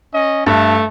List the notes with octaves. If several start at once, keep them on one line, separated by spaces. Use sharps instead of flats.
C#4 D#5
G2 A3